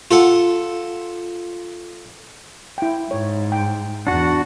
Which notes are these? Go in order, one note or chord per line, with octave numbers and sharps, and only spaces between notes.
F4 A4 F#5
E4 G5
G#2 C#5
G5
E2 D4 F#4 F#5